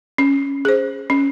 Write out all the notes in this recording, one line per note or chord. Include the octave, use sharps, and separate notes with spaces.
C#4
G#4 C5
C#4